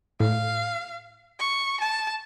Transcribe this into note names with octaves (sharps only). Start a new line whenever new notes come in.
A2 F5
C#6
A5